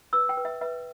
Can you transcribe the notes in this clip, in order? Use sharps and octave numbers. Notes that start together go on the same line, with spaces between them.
B4 E6
G5
B4
E5
B4 E5